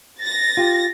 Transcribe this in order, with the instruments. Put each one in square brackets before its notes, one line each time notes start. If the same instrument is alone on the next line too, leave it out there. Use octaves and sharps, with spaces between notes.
[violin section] A6 A#6
[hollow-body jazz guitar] F4 G4